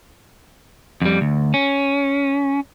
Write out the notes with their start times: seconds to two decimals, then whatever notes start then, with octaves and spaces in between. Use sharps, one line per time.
1.02 F2 G3
1.21 D2
1.54 C#4